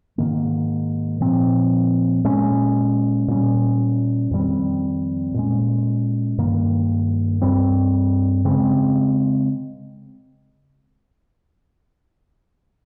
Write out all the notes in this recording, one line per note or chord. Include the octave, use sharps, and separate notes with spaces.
G#2 D#3 A#3
A#2 F3 C4
A#2 G#3 C#4
A#2 G3 C#4
F2 D#3 G3 C4
A#2 G#3 C#4
G2 D#3 A#3
G2 G3 C4
C#3 G#3 C4